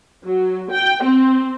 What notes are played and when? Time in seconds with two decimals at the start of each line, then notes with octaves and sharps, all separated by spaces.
0.25 F#3
0.71 G5
1.03 C4